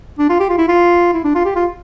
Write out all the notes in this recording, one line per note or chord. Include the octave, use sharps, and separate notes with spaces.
D4
F4
G4
F4
E4
F4
E4
D4
F4
G4
F4